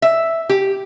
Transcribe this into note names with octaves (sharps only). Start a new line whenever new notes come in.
E5
G4